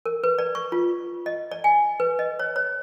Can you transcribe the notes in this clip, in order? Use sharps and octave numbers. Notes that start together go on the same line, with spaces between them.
A#4
B4
D5
C#6
F4
D#5
D5
G#5
B4
D#5
C#5
C#5